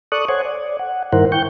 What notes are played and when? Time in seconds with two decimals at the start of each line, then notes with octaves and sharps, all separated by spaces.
0.12 A4 D5 C#6 D#6 F#6
0.29 C5 C#5 F#5 G#5
0.45 D5
0.79 F#5
1.13 G2 D#3 E4 A#4 C5 F#5
1.32 G5 C#6 G6